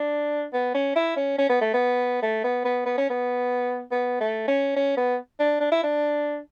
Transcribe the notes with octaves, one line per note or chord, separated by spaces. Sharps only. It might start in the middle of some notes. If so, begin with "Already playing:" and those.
Already playing: D4
B3
C#4
E4
C#4
C#4
B3
A3
B3
A3
B3
B3
B3
C#4
B3
B3
A3
C#4
C#4
B3
D4
D4
E4
D4